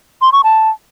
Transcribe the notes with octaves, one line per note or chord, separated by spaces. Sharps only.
C6
C#6
A5